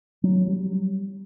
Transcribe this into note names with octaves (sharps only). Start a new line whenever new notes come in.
F#3
G3